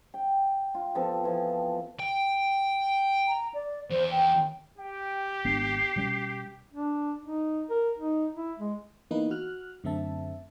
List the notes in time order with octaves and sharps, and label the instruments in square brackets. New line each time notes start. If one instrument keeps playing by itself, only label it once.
[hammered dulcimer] G5
F4
F3 B3 C4 A4
E3 F3
[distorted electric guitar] G5
[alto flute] A#5
D5
[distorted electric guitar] E2 [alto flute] C5
[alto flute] G5
[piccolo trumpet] G4 [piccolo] G5
[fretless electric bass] G#1 B3 D4 [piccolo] C7
[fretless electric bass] B2 G3 C#4
[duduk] D4
D#4
A#4
D#4
E4
G#3
[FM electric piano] E3 A#3 B3 D#4 B4
F#4 F6 F#6
F#2 D3 A3 C4 E5 A5